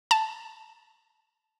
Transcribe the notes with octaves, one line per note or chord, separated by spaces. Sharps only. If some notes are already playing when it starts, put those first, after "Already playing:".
A5